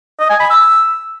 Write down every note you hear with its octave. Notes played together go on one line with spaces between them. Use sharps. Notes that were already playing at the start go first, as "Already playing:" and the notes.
D#5
G#5
B5
E6